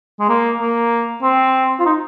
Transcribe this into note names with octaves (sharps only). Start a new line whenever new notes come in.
G#3
A#3
A#3
C4
F4
D#4